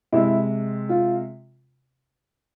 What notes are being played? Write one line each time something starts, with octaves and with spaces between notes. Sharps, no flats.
C3 G#3 E4
F4